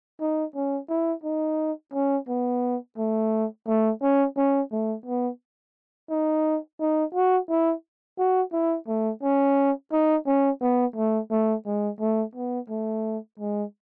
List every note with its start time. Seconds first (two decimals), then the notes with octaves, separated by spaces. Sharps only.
0.21 D#4
0.55 C#4
0.89 E4
1.24 D#4
1.94 C#4
2.28 B3
2.98 A3
3.68 A3
4.02 C#4
4.37 C#4
4.72 A3
5.06 B3
6.10 D#4
6.80 D#4
7.15 F#4
7.50 E4
8.18 F#4
8.53 E4
8.88 A3
9.23 C#4
9.93 D#4
10.26 C#4
10.62 B3
10.96 A3
11.31 A3
11.66 G#3
12.00 A3
12.35 B3
12.69 A3
13.40 G#3